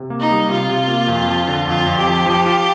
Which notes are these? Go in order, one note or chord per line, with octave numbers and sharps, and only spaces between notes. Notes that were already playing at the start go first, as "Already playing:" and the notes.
Already playing: C3
A#3
D#4
G3
C3 F4
C3
A#3
F2
F3
D3
F2 F4
F2
G4
F3
F3
F4